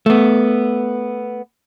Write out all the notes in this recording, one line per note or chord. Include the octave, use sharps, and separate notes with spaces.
A3 B3